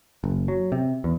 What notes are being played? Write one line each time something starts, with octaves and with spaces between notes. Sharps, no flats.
F#1
F#3
C3
E2